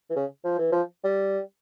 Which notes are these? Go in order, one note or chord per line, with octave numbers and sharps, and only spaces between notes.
E3
C#3
F3
E3
F3
G3